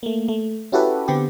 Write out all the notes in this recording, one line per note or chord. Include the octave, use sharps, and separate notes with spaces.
A3 A#3
A3
C#4 E4 F#4 G4 A4 B4
D3 B3 C4 G4